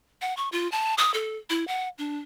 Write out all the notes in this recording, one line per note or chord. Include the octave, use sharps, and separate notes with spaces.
F#5
C#6
F4
A5
D#6
A4
E4
F#5
D4